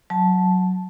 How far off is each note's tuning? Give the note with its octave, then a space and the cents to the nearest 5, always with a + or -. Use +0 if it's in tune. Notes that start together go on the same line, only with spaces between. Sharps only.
F#3 +0 A5 -10